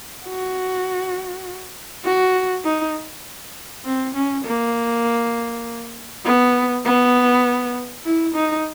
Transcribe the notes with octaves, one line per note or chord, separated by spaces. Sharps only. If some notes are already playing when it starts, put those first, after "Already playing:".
F#4
F#4
D#4
C4
C#4
A#3
B3
B3
E4
D#4